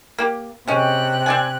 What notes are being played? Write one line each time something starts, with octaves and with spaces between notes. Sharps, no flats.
A#3 G4
C3 G#3 C#4 G5 F#6
C4 D5 G#5